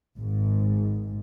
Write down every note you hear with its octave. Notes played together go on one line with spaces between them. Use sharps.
G#1 G#2